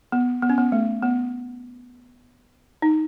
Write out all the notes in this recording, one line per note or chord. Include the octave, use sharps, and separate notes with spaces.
B3
B3
C#4
B3
A3
B3
D#4